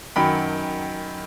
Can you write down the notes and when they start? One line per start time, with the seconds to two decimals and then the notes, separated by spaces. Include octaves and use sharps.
0.16 F#2 D#3 F#3 G5 B5